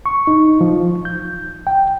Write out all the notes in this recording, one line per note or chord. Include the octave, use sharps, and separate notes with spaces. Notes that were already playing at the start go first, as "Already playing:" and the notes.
C#6
D#4
F3
G6
G5